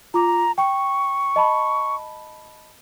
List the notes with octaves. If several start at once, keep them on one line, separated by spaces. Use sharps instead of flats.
F4 A#5 D6
G5 C#6
D#5 A5 B5